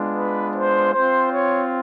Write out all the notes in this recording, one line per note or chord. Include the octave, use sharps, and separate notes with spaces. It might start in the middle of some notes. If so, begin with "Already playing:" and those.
Already playing: G#3 B3 D4 F4
B4
C5
C4 F4 C5
C#5